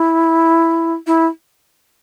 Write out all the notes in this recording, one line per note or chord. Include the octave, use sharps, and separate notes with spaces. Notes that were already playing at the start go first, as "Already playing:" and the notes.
Already playing: E4
E4